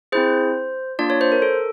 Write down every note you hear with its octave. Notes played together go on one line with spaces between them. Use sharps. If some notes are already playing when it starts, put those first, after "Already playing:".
C4 E4 G#4 C5
A#3 D4 F4 D5
C#5
C5
A#4
A4